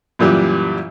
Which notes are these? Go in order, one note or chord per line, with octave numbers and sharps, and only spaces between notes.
F#2 A#2 E3 G3